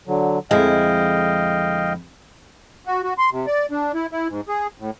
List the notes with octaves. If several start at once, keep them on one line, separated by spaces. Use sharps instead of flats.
D3 F#3
F2 D3 G#3 E4 D#5 F5 G5
F#4
F#4
C6
C3
D5
D4
E4
E4
G#2
G#4
A2